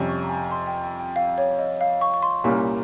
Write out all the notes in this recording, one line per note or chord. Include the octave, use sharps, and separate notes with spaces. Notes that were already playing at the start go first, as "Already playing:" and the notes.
Already playing: F2 C3 G3 C#4
C#6
A#5
G#5
C6
G5
G5
G5
F5
C#5
D#5
F5
C#6
C#6
C6
C2 A#2 G3 A#3 C#4